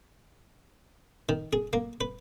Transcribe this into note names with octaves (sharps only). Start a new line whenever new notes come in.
D#3
G#4
A#3
B4